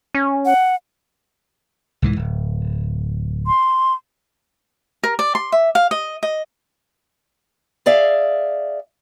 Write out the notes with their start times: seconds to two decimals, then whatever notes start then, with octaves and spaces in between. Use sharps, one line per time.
0.15 C#4
0.45 F#5
2.02 C2 G#2 E3
2.16 D1
3.47 C6
5.03 A#4
5.19 D5
5.35 C6
5.52 E5
5.75 F5
5.91 D#5
6.23 D#5
7.86 G#4 D5 E5 F5